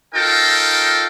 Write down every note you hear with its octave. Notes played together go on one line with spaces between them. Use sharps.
D#4 F4 A4 A#4 G5